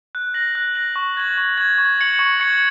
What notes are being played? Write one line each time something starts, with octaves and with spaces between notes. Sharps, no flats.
F#6
A#6 F#7
F#6
A#6 F#7
C#6
G#6 F#7
C#6
G#6 F#7
C#6
G#6 C#7 F#7
C#6
G#6 C#7 F#7